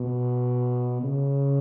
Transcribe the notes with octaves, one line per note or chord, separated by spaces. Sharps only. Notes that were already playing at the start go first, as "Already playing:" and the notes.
Already playing: B2
C#3